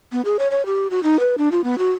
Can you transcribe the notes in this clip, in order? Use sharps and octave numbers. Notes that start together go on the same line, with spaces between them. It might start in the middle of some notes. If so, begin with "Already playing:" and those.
B3
G#4
C#5
C#5
G4
F#4
D#4
B4
D4
F4
B3
F#4